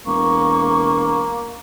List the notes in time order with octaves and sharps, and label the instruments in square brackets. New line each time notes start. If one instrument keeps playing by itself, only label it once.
[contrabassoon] E1 [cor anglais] A#3 [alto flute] C#6